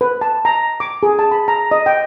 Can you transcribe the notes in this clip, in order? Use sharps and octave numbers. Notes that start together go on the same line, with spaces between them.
B4
A5
A#5
D6
G#4
A5
B5
A#5
D#5
G5